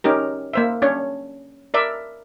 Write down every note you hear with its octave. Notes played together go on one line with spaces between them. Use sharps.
C#4 D#4 G4 A#4
A#3 C5 E5
C#4 D4 C#5
A#4 D5 E5